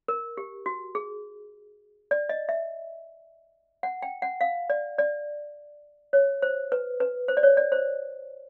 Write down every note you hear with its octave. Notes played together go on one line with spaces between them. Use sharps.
A#4
G4
F#4
G#4
D5
D#5
E5
F#5
G5
F#5
F5
D5
D5
C#5
C5
B4
B4
C5
D5
C#5
D5
C5